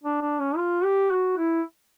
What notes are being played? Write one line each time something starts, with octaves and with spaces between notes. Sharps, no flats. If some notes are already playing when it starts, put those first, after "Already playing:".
D4
D4
C#4
F4
G4
F#4
E4